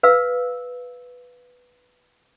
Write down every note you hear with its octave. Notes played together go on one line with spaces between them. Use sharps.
B4 F5 E6